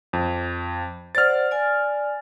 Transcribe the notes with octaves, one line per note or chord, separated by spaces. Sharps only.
F2
C5 D5 F#5 F6 A6
D5 G#5